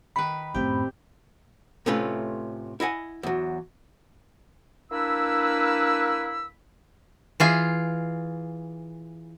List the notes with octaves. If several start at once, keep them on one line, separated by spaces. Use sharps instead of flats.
D#3 B4 B5
F#2 A2 C4 G4
A2 C3 A3 C#4 F4 B4
E4 D#5 F#5 G#5
E2 F#3
A#3 D4 E4 B4 B5 E6
E3 F4 G#4